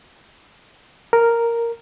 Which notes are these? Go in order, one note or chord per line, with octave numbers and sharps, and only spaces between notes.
A#4